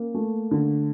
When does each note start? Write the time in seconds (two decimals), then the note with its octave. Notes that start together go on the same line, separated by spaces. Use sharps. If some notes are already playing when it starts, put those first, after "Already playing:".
Already playing: A#3 C#4
0.15 A3
0.51 D3